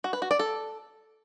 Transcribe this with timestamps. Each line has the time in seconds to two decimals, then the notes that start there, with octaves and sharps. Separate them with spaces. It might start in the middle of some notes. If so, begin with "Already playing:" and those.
0.04 F#4
0.13 B4
0.22 F#4
0.31 D5
0.39 A4